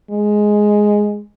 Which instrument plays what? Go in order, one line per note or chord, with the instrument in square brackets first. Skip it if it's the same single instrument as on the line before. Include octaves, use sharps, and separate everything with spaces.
[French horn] G#3